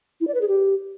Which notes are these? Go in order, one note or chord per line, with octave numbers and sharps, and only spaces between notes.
E4
D5
B4
G#4
G4